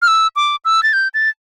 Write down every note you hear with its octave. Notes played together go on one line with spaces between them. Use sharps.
F6
E6
D6
E6
A6
G6
A6